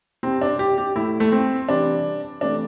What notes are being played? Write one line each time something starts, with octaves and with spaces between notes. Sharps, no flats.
C3 G3 C4
D4
G4
G4
A2 A3 E4
A3
C4
C3 E3 G3 D4
C3 E3 A3 D4